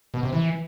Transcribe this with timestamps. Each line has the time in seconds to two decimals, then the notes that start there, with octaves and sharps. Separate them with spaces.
0.14 B2
0.23 C3
0.33 E3